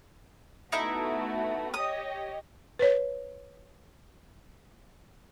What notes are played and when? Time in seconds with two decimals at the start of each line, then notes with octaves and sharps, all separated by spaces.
0.72 A3 B3 D#4 E4 F#4 E5
1.74 G4 C#5 D#5 D#6
2.79 B4 C#5